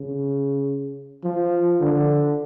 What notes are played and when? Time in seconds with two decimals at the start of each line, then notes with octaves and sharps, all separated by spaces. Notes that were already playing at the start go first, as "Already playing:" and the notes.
Already playing: C#3
1.24 F3
1.81 D3